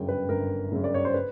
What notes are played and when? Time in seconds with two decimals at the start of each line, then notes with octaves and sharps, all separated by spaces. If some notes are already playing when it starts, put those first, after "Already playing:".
Already playing: G1 F#2 C#3 G5
0.08 B4
0.29 G1 A#4
0.72 F#2 C#3
0.84 D5
0.94 C#5
1.05 C5
1.14 B4